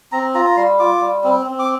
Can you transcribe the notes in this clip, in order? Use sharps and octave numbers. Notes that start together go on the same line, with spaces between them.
C4 A#5
F4 A#5
A#5
G3 C6
F4 D6
G3
C4
C4
D6